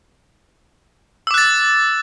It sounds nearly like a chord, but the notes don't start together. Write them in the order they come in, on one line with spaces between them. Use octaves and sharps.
E6 D6 F#6 A6